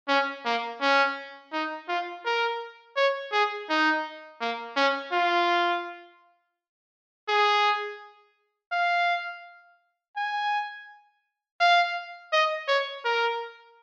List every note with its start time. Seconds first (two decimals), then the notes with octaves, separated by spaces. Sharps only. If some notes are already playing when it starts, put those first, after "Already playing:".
0.08 C#4
0.45 A#3
0.81 C#4
1.53 D#4
1.88 F4
2.25 A#4
2.96 C#5
3.32 G#4
3.69 D#4
4.41 A#3
4.76 C#4
5.12 F4
7.29 G#4
8.72 F5
10.17 G#5
11.60 F5
12.33 D#5
12.68 C#5
13.05 A#4